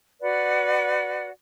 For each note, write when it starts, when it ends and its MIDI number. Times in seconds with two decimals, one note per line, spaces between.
0.20 1.29 66
0.20 1.29 71
0.20 1.29 74
0.20 1.29 78